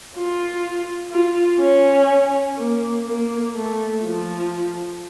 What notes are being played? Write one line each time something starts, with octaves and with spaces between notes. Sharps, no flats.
F4
F4
C#4
A#3
A#3
A3
F3